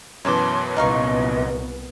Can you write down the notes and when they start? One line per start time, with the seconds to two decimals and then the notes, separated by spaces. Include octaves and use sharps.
0.25 F#2 B2 E3 C#5 A5 C6 D6
0.77 C2 A#2 B3 D#4 D#5 F5 C#6